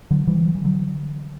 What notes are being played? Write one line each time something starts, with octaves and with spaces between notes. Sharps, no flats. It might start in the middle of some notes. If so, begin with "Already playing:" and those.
D3 F#3
E3 G3
F#3
E3
D3 F#3